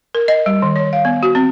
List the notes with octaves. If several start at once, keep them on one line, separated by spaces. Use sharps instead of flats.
A#4
D#5
G3
D#3
C#5
F5
B3
F#4
C4